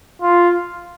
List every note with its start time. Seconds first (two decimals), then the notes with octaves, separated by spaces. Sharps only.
0.22 F4